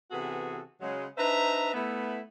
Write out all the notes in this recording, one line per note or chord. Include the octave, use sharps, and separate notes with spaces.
C3 E3 B3 F#4 G#4 A4
C#3 F#3 G#3
D4 D#4 B4 C5 E5 A#5
A3 B3 E4